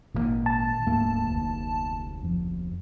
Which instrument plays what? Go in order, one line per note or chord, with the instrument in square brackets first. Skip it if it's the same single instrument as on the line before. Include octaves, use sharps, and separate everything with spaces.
[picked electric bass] G#1 D3 A#3 [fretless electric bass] A#2 D#3
[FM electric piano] A5
[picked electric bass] D1 G#2 A3 [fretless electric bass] A#3
[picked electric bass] F1 D2
[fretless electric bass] F2 F3